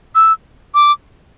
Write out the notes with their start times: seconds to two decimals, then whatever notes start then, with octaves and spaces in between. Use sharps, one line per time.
0.15 E6
0.74 D6